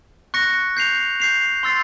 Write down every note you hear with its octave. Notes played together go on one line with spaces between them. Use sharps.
C#6 F#6 A#6 C#7
G6 C7 F7
G6 C7 F7
C6 E6 A6 C7